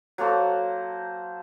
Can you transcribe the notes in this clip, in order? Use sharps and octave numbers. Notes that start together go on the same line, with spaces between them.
F#3 A#3 A4 C5